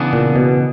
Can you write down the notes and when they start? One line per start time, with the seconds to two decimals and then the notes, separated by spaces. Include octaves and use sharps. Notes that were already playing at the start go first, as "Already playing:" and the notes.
Already playing: C#3 E3 B3 D4
0.13 A#2
0.36 B2